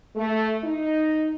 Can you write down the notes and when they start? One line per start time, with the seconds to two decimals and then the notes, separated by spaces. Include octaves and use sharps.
0.15 A3
0.63 D#4